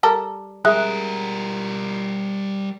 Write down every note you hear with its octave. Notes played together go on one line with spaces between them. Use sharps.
G3 A4 A#4
G3 G#3 G#4 A#4 E5 F#6